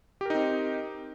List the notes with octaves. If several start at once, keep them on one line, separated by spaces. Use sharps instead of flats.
C4 D#4 G4 A#4